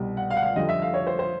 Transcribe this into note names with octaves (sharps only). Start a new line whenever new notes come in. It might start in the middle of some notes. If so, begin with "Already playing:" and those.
Already playing: C2 B2 G3
F#5
F5
F#5
F5
F2 D3 G3 D#5
E5
F5
C#5
C5
C5